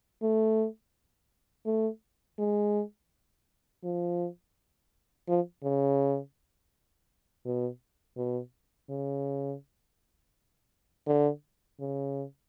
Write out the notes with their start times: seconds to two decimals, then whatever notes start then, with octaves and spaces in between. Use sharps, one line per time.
0.22 A3
1.66 A3
2.38 G#3
3.84 F3
5.28 F3
5.64 C#3
7.45 B2
8.17 B2
8.90 C#3
11.07 D3
11.80 C#3